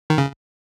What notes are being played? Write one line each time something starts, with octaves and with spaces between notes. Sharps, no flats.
D#3
C#3